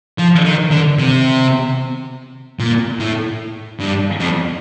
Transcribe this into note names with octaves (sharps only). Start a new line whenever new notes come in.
F3
D#3
D3
C3
A#2
A2
G2
F2